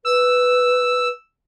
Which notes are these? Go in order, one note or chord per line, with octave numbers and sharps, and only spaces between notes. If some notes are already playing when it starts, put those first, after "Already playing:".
B4 E6